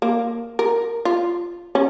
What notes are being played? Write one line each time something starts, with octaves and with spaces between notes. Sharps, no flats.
A#3
A#4
F4
C#4